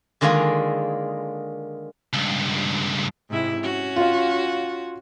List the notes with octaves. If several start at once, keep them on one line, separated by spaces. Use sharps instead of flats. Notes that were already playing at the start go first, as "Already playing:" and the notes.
D3 D#3 G#3 A#3 F4 G#4
C#2 G2
G#2 C3 E4
C#4 F#4
F4 F5